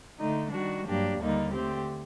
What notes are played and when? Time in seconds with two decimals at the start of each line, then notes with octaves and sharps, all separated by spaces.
0.19 D3 A3 D#4
0.52 D#3 G3 D4 F#4
0.86 G2 F#3 A#3 D4 G4
1.20 D#2 D3 G3 A#3 D#4
1.53 D3 A3 C4 G4